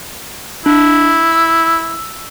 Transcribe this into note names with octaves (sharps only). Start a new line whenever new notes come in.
D4 E4
E6